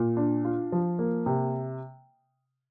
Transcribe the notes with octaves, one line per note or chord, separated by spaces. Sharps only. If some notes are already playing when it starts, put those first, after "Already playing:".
Already playing: A#2
D4
F4
F3
A#3
C3